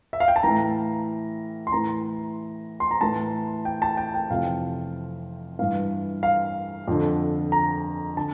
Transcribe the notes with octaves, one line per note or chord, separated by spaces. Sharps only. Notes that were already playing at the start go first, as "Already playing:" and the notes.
E5
F5
G5
A5
A2 E3 A#5
C6
A2 E3 A#5
C6
A#5
A2 E3 A5
G5
A5
G5
G5
F2 C3 E3 F5
G2 E3 F5
F5
F2 D3
A#5
D3 A5